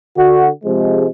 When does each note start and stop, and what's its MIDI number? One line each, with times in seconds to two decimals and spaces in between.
0.17 0.48 50
0.17 0.48 66
0.64 1.07 48
0.64 1.07 53
0.64 1.07 56